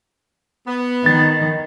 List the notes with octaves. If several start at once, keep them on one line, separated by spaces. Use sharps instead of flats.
B3
D#3 A6